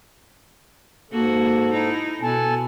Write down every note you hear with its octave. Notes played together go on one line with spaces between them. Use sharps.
G#2 A#3 F#4 A4
D#4 E4
B2 A4 G#5 A5